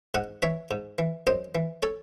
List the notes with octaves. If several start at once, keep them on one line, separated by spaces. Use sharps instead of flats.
G#2 D#5 F#5
E3 C#5 E5
G#2
E3
F#2 C5 D#5
E3
A4 C#5